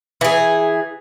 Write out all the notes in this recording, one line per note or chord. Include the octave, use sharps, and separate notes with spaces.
E3 G#4